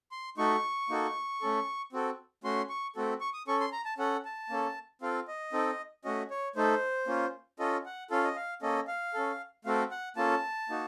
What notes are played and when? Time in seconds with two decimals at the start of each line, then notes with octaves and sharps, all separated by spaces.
0.12 C6
0.37 A3 D#4 F#4 A4 C#6
0.89 A#3 D#4 F#4 A4
1.41 A3 C#4 A4
1.92 C4 F#4 A4
2.44 A3 C#4 F#4 C6
2.69 C#6
2.96 A3 C4 F#4 A4
3.21 C#6
3.34 D#6
3.48 C#4 A4 C#6
3.60 C6
3.72 A#5
3.85 A5
3.98 C#4 A4 F#5
4.25 A5
4.50 A#3 C#4 A4
5.02 C4 F4 A4 F5
5.28 D#5
5.53 C4 D#4 A4
6.04 A3 C#4 F#4 D#5
6.31 C#5
6.56 A3 D#4 A4 C5
7.07 A#3 C#4 F4
7.59 C#4 F4 A4 D#5
7.86 F#5
8.10 C#4 F4 A4 F5
8.24 D#5
8.36 F5
8.62 A#3 C#4 A4 D#5
8.88 F5
9.14 C#4 A4
9.65 A3 C4 F#4 A4 F5
9.91 F#5
10.16 A#3 C#4 F4 A4 A5
10.69 A#3 D#4 F#4